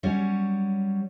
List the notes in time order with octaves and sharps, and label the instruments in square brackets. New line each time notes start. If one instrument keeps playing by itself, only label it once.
[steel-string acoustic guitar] F#3 G3 C#4 C#5